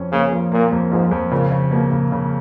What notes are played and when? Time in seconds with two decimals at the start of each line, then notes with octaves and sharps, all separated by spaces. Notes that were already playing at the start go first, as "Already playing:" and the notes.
Already playing: F2 C#4
0.12 C#3 A#3
0.32 F3
0.52 A#2 A#3
0.72 F2
0.92 G#2 F3
1.11 F2
1.31 A#2 C#3
1.52 C#3
1.71 B2 A#3
1.91 C#3
2.12 C#3